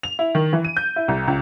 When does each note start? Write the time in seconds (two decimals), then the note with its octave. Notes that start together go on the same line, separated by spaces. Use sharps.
0.03 F7
0.19 E4
0.35 D#3
0.53 E3
0.65 D#7
0.77 G6
0.96 E4
1.08 C2
1.28 C#2